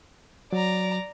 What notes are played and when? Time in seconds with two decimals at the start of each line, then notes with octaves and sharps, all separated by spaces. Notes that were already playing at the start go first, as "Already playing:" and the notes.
0.52 F#3 D5 A#5